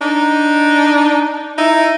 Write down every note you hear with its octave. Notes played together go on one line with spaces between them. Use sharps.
D4 D#4
D#4 E4